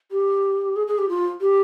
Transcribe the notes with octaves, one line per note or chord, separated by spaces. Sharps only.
G4
G#4
G#4
G4
F4
G4